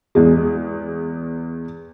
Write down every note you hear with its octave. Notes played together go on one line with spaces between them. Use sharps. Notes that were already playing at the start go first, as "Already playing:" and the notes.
E2 G#3